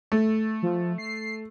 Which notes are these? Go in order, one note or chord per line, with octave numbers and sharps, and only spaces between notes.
A3
F3
C7